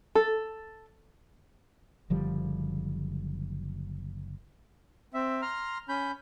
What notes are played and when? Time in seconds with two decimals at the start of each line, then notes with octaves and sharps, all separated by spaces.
0.15 A4
2.10 F#1 D3 F3 G3
5.14 C4 E5
5.42 A#5 C6 F6
5.89 C#4 B5 G6